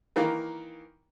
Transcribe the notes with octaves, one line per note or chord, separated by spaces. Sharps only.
D#3 E3 A#3